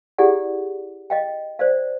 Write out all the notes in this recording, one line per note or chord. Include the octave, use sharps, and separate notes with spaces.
E4 G4 G#4 D5 F#5
D#5 F5 G5
C5 D5 F5